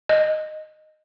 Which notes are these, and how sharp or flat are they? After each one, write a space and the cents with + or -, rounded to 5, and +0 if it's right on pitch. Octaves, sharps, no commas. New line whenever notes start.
D#5 -10